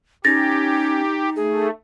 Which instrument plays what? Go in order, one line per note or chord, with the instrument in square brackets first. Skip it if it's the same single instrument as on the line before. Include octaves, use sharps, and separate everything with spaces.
[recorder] C#4 [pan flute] D#4 [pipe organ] G4 [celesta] A6 A#6
[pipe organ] A3 [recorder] G#4